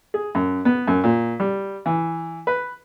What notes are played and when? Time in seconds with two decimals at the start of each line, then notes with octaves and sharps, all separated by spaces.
0.14 G#4
0.35 F#2
0.65 B3
0.87 F#2
1.04 A#2
1.40 G3
1.86 E3
2.47 B4